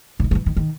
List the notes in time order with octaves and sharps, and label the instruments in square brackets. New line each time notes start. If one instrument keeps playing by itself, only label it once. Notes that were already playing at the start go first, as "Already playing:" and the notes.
[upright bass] C#3
D#3
F#3
E3
D#3
D#3